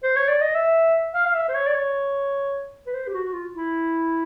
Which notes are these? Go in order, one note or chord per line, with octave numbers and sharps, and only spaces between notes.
C5
C#5
D5
D#5
E5
F5
F5
E5
C5
C#5
D5
C#5
B4
C5
G4
F#4
F#4
F4
E4